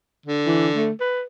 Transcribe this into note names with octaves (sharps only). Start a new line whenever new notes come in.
D3
E3
A3
B4